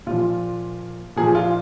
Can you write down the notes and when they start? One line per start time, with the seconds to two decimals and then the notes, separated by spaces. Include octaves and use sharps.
0.07 A#2 F3 F4
1.16 A#2 F3 G#4
1.35 F4